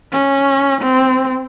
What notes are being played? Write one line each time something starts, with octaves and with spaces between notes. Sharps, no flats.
C#4
C4